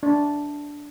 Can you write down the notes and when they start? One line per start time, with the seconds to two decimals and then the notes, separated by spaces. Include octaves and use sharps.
0.03 D4